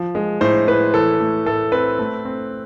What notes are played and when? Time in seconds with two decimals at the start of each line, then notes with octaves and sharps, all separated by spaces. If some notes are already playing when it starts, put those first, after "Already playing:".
Already playing: F3
0.15 G#3
0.41 A2 C5
0.67 A2 B4
0.94 E3 A4
1.20 A3
1.46 A2 A4
1.72 C4 B4
1.99 A3
2.25 C4